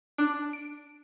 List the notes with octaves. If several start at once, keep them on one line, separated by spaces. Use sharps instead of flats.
D4
D7